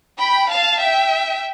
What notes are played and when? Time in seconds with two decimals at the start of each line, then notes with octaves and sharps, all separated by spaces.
0.17 G5 B5
0.49 F5 A5
0.81 E5 G5